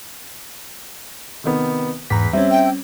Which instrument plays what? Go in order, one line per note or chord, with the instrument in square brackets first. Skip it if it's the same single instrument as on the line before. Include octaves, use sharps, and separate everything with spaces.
[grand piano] C3 D#3 B3
[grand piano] E2 [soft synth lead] G#2 [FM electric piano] A#5 B6
[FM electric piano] G3 C#4 [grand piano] C4 [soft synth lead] E5
[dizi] G5